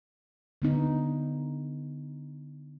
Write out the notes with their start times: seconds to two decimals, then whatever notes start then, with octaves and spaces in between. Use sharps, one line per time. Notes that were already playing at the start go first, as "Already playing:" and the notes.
0.62 D3 B3 D#4